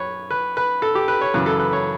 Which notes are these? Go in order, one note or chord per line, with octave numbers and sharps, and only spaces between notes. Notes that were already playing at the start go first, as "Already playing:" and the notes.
Already playing: F#2 B4 C#5
B4
B4
A4
G4
B4
C#5
F#2 C#3 E3 B4
A4
B4
C#5